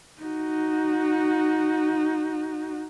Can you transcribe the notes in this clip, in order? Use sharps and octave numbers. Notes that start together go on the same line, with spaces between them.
D#4 F#4